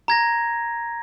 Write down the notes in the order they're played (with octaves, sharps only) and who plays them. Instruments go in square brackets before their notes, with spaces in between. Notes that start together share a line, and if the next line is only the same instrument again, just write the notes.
[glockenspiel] A#5 G#6 A#6